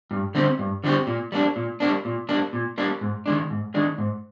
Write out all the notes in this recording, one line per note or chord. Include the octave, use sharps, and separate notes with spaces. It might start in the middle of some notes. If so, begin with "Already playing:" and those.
G2
D3 G3 C4 G4
G2
D3 G3 C4 G4
A#2
G3 A#3 D4
A#2
G3 A#3 D4
A#2
G3 A#3 D4
A#2
G3 A#3 D4
G#2
D#3 G#3 D4
G#2
D#3 G#3 D4
G#2